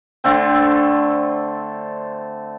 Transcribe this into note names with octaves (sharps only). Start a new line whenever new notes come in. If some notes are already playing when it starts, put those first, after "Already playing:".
D3 A3 C4